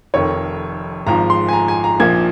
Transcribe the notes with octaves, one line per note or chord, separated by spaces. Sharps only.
F1 F2 D#3 C#5
G#1 G#2 F3 G#3 A#5
C6
G#5
A#5
G#5
A#5
A#1 A#2 F3 A#3 G#6